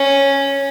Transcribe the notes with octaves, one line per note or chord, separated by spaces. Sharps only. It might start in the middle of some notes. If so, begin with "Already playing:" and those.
Already playing: C#4